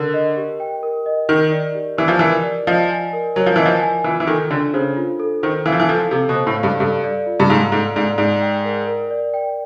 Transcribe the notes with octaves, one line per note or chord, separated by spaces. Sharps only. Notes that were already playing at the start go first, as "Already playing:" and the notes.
Already playing: D3 A#4
D#5
G4
G5
A#4
D#5
D#3 A#4
D5
G4
E3 G4
F3
E3 A#4
D5
F3 D#5
G#5
A#4
F#3 A#4
F3
E3 D#5
F3
G#5
E3 F4
E3
D#3 A4
D3 D4
C#3 C5
F4
A4
D#3 C5
E3 F5
F3
E3
F3 A4
C3 A4
B2
C5
A2
F5
G2
G2 A4
D5
F4
G2
G#2 F5
G#2 A4
G#2 D5
G#2 D5
G5
A#4
A#4
D5
G5